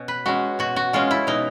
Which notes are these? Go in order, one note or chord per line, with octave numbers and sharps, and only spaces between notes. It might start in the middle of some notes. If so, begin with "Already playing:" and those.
Already playing: B2 C#4
B4
G#3 C#4 F#4
B2 F#4
F#4
G#3 C#4 F4
E4
B2 D#4